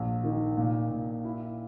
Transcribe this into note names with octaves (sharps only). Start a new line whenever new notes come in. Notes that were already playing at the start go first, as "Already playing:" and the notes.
Already playing: A#1
D#3
A#2
A#2
E4